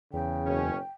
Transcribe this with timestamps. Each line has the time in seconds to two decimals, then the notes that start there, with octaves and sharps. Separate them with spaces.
0.13 E2 C#3 G5
0.45 F#1 B2 C#4